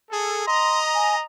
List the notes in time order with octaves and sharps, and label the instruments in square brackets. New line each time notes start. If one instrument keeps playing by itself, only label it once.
[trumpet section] G#4 A4
[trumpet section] D#5 A#5 [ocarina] C6
[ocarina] G#5